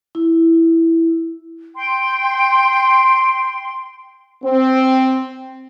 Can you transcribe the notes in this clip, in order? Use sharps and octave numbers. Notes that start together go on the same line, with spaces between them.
E4
G5 C6
C4